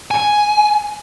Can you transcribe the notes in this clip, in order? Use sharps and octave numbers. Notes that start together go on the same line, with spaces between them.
G#5